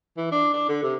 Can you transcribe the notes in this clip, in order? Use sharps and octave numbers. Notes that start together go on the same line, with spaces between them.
E3
D4
D4
D3
C3